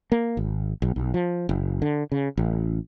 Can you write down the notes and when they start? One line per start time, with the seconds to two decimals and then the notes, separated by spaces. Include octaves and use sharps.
0.12 A#3
0.37 G#1
0.82 B1
0.96 B1
1.14 F3
1.49 F#1
1.82 D3
2.12 C#3
2.37 A1